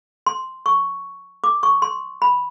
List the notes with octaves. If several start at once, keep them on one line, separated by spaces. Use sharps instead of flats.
C6
C#6
D6
C#6
C6
B5